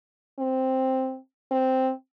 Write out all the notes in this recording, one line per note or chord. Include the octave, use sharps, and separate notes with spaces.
C4
C4